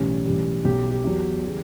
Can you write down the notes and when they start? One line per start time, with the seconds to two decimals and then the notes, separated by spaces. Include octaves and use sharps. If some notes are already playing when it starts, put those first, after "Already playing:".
Already playing: B1 A2 E3 G3 C#4
0.25 B1 A2 E3 G3
0.64 B1 B2 G3 G4
0.91 G4
1.04 E2 B2 F#3
1.43 C#3 E3 G3